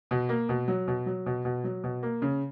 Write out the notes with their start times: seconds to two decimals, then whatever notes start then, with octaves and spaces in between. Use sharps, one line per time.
0.11 B2
0.29 A#3
0.49 B2
0.68 F#3
0.88 B2
1.06 F#3
1.26 B2
1.45 B2
1.64 F#3
1.84 B2
2.03 A#3
2.22 C#3